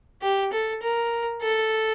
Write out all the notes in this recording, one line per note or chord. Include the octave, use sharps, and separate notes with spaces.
G4
A4
A#4
A4